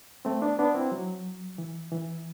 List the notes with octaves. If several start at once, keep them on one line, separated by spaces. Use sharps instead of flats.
A3 C4
B3 D4
B3 D4
C4 E4
F#3
E3
E3